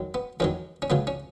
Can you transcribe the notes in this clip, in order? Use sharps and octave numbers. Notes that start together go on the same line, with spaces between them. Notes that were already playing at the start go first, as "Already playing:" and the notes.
Already playing: F#2 D#3 F#3
B3
E2 D#3 F#3 C#4
C#4
C#2 C#3 F#3 B3
C#4